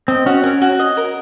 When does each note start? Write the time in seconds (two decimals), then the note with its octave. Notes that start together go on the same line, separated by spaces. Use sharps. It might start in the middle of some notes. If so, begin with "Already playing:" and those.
0.08 C4 D#5
0.26 C#4 F#4
0.43 C#4 A#4
0.62 F#4
0.79 D#5
0.97 A#4